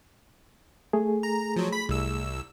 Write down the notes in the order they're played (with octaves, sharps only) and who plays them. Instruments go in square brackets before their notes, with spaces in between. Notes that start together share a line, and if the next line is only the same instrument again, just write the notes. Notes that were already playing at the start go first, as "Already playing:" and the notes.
[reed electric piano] A3 G#4
[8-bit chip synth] A#5
F3 F#3
B5 B6
C2 E6